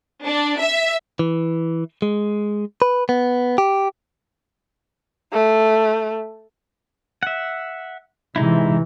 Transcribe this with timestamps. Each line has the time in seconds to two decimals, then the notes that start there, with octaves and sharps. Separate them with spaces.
0.25 D4
0.60 E5
1.19 E3
2.02 G#3
2.82 B4
3.09 B3
3.58 G4
5.33 A3
7.23 E5 F#5
8.36 C3 E3 G#3 D#4 E4